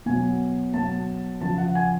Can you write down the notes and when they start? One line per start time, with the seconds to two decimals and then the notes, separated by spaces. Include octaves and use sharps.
0.06 B2 F#3 G#5
0.74 B2 F#3 A5
1.41 C#3 F3 A5
1.58 F#5
1.75 G#5